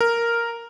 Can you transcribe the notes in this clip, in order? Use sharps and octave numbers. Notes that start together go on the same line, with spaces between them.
A#4